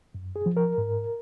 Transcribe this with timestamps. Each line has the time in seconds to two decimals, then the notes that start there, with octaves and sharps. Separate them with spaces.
0.15 F#2
0.36 G#4
0.46 F3
0.57 A#4
0.78 G#2